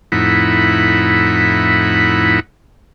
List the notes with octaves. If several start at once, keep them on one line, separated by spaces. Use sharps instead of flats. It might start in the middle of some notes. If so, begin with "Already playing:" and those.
F2 A2 D#4 E4 F#5 B5